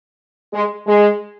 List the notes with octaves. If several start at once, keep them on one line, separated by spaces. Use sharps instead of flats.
G#3
G#3